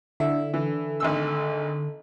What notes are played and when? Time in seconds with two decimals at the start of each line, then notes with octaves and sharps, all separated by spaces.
0.20 D3 E4
0.54 E3 A4
1.00 G#1 D2 E6